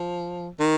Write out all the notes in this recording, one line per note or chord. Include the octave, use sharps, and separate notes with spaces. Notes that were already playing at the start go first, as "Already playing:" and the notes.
Already playing: F3
D#3